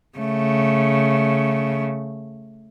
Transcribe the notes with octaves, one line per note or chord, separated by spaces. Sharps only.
C#3 A3